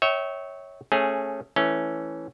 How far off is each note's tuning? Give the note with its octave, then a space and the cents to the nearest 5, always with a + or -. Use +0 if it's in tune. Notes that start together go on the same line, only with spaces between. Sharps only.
C#5 +0 E5 -30 G5 -25
A3 +0 C#4 -20 G#4 +0
E3 +0 A3 +0 C#4 +0